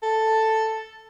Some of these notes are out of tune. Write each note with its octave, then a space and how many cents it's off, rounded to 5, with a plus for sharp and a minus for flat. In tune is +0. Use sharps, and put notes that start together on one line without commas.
A4 +5